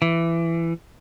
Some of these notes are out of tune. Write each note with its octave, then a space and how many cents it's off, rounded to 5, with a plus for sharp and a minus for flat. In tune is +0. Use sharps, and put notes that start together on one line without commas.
E3 +20